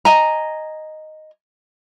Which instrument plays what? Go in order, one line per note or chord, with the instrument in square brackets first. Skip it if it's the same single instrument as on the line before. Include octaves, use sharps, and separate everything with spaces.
[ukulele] D#5 G#5 A#5